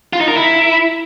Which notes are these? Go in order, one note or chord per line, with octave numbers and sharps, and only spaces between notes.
F4
D#4
A#4
E4